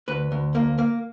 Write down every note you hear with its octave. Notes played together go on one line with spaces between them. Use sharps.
D2 B4
D2
A#3
A#3